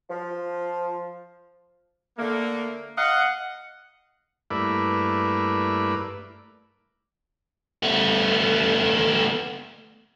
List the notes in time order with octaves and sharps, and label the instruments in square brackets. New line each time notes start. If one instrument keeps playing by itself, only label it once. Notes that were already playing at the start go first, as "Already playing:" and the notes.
[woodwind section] F3
[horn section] D3 A3 A#3
D#5 F5 F#5
[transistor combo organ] G2 A3 A#3 E4 B4 D5
[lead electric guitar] A3 B3